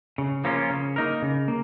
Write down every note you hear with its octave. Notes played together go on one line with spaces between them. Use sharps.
C#3
F3 A#3 C#4 F4
C#3
A#3 D#4 A#4
C#3
A#3